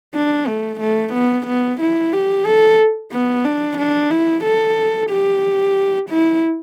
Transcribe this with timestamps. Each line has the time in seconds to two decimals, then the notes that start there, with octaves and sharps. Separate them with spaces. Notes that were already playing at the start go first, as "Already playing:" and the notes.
0.14 D4
0.47 A3
0.80 A3
1.13 B3
1.47 B3
1.80 E4
2.13 G4
2.46 A4
3.12 B3
3.45 D4
3.78 D4
4.10 E4
4.44 A4
5.10 G4
6.10 E4